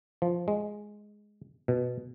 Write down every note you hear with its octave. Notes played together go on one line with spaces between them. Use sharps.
F3
G#3
B2